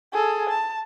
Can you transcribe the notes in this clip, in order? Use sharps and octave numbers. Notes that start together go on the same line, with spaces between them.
G#4 A4
A5